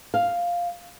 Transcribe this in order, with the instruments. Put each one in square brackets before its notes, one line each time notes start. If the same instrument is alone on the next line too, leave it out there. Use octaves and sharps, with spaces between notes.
[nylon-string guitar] F5